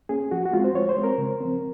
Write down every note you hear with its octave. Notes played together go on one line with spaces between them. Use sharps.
A#3 C#4 G#4
F3 F#4
F#4
G#3 C4 F4
C5
F3 C#5
C5
G#3 C4
A#4
C#3
F3 C4